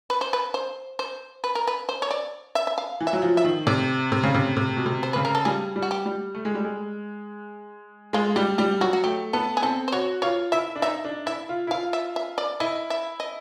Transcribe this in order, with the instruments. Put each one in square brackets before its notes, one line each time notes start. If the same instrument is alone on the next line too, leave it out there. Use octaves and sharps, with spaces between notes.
[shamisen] B4
C5
B4
C5
C5
B4
A#4
B4
C5
C#5
D5
E5
E5
F5
[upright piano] E3
[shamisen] E5
[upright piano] F#3
F3
[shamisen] E5
[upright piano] D#3
[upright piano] C3 [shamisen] D5
[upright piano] C3
C#3
C3
C3
B2
C3
[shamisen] C5
[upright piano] C#3 [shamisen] B4
[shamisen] A#4
A4
[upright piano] G3 [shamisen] G#4
[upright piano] G3
[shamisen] F#4
G4
[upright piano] G3
A3
G#3
G3
G#3
[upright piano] G#3 [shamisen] F4
[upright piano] G3 [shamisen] G4
[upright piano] G3 [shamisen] G4
[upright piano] F#3 [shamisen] F#4
[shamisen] F#4
[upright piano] A3 [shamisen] G4
[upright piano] B3 [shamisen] A4
[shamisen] G#4
[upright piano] C4 [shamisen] A4
[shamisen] C5
[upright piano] F#4 [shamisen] C#5
[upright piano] F4 [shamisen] C#5
[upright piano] E4 [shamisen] E5
[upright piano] D4
[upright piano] D#4 [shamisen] E5
[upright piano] D4
[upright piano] E4 [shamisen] E5
[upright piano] F4
E4
[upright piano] F4 [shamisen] F5
[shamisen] E5
E5
D5
[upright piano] E4 [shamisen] D#5
[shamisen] E5
D#5